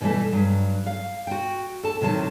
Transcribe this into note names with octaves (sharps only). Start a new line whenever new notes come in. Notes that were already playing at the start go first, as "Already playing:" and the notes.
B2 E3 F#3 G3 A3
G2 F#3
F5
F#4 G5
A4 A5
A2 C3 D#3 F#3 A5